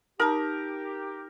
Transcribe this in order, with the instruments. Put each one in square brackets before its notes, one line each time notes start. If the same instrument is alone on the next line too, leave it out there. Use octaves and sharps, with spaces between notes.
[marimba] D#4 A5 [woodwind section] G4 [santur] A#4